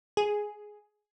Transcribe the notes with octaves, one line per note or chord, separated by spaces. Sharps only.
G#4